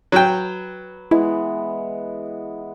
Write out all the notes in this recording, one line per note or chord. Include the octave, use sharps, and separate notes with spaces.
F#3 B4 G5
E3 G#3 B3 E4